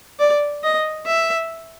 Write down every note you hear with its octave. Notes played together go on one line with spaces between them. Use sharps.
D5
D#5
E5